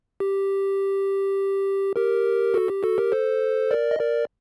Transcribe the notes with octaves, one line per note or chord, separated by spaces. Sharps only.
G4
G4 A#4
F#4 A4
G4
F#4 A4
G4 A#4
A4 C5
A#4 D5
D#5
A#4 D5